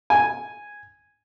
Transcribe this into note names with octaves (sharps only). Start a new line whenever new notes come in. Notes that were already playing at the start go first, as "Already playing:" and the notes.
G#5